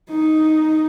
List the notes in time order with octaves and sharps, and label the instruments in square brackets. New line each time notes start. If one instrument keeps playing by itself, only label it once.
[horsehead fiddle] D#4